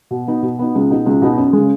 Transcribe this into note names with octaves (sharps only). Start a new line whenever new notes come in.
B2
B3 D#4
B2
B3 D#4
C#2
B2 B3 D#4
C#2
B2 B3 D#4
F#2
C#3 G#3